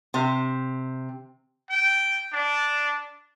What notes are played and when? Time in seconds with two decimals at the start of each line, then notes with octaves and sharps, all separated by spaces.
0.14 C3
1.70 G5
2.33 D4